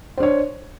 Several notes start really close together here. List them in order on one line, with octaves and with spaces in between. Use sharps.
C5 D4 C#5